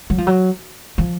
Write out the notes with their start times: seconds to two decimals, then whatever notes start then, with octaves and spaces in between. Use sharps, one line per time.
0.10 F#3
0.18 F3
0.27 F#3
0.98 F3